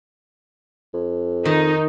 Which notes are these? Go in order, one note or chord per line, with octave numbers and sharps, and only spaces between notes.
F2
D#3 D#4